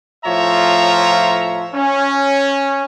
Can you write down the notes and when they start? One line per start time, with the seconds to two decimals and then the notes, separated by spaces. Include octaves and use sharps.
0.25 A2 F3 F4 C#5 E5 A#5
1.75 C#4